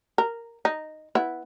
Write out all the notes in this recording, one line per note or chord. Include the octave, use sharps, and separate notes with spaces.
A#4
D#4
B3 E4